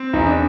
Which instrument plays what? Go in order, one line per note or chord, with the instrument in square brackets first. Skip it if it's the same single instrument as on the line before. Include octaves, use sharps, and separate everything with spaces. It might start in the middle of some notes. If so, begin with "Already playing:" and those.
Already playing: [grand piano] C4
[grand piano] E2 [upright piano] D#4
[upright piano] D4